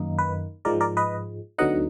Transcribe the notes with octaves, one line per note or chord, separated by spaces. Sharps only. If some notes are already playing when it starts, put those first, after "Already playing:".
Already playing: F#2 D#3 A#3 D#4
B4
G#2 F3 G#3 A#4 D5
A#4 D5
B4 D#5
D2 D3 F#3 B3 D#4 D#5 F#5